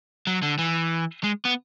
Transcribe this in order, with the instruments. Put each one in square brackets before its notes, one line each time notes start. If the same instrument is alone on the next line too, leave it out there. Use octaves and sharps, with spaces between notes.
[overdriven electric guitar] F#3
D3
E3
G#3
B3